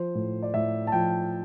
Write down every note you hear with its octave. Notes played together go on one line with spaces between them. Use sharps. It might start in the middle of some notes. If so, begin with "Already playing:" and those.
Already playing: F3 C5
A2
D5
A2 E5
A5
F3 G5